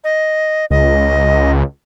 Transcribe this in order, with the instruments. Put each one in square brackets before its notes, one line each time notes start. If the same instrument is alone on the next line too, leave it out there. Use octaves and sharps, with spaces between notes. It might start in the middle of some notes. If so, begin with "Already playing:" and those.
[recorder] D#5
[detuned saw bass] C#2 [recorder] D#5